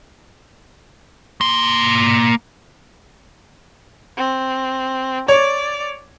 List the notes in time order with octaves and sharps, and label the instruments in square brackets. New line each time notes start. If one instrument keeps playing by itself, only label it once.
[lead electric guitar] A#3 C6
[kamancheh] C4
[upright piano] C#5 [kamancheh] D5